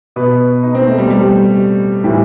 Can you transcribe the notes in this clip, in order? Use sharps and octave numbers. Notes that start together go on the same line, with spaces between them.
B2 B4
D#4
C4
A3
G3
G3
A2 E3 G3